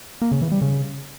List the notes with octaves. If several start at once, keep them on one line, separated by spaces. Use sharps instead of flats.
A#3
C#3
E3
G3
C#3